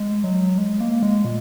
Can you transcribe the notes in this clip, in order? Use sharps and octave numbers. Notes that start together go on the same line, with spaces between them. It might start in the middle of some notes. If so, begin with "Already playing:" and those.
Already playing: G#3
F#3
G#3
A#3
G#3
A#2